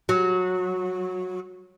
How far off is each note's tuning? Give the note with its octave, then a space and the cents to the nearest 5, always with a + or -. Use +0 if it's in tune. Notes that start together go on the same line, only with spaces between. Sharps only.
F#3 -15